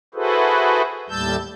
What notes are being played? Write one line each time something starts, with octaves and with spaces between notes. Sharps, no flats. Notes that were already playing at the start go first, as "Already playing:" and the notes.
E4 F#4 G#4 A4 B4 C5
D#2 A2 G3 A5 E6 G6